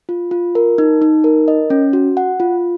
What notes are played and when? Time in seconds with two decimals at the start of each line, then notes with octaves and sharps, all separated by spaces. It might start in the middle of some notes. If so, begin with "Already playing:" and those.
0.09 F4
0.31 F4
0.55 A#4
0.78 D#4
1.02 D#4
1.24 A#4
1.48 D#5
1.70 C#4
1.93 F#4
2.17 F#5
2.40 F4